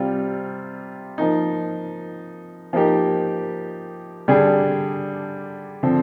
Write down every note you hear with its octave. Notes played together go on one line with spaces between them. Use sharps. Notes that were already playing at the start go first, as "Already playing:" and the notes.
Already playing: C3 G3 C4 F4
F3 A#3 D#4
F3 A#3 D#4 G4
D3 G3 D4 G#4
D3 F3 C4